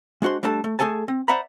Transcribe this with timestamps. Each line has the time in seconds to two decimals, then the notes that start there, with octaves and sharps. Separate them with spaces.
0.22 G#3 D4 F#4 C5 C6
0.43 G3 A3 D4 A4 A5
0.64 A3
0.79 A3 G#4 A4 G#5 A5
1.08 C4
1.28 C5 D5 E5 F#5 A#5 B5